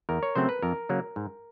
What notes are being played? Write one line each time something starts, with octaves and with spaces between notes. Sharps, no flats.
E2 A#4
C#5
C#3 F#3 A3 C4 C5
B4
F2 A#4
C#3 F#3 A#3
G#2